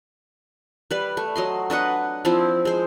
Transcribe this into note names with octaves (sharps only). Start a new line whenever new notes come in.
G3 B4
A3
F#3 D#5 C6
D4 B4 D#5 F#5
F3 C4 E4
G#3 C5